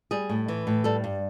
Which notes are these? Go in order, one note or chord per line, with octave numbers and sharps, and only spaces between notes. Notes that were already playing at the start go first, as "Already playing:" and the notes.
G3 G#4
A2
E3
A2
G3 A4
G2